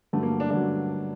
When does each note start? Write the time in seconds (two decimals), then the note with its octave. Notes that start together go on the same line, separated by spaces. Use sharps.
0.13 G2 D3 F#3 A3
0.23 A#3
0.40 D4
0.50 G2 D3 F#3 D4